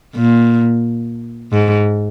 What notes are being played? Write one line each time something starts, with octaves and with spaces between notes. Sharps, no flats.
A#2
G#2